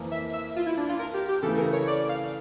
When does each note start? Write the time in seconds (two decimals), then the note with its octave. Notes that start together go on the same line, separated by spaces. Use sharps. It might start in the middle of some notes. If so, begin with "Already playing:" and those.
Already playing: F2 E3 A#3
0.11 E5
0.33 E5
0.56 F4
0.66 E4
0.77 D4
0.89 F4
0.99 A#4
1.14 G4
1.28 G4
1.42 C#3 E3 A3 A4
1.57 A#4
1.73 C#5
1.87 D5
2.09 F5